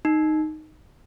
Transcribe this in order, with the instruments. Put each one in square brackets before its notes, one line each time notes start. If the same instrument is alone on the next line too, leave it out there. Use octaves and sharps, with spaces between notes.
[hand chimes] D#4